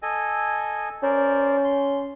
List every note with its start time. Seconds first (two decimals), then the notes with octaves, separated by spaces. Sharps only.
0.02 A4 D#5 G#5
1.03 C#4 A#4 C5 D5
1.64 C6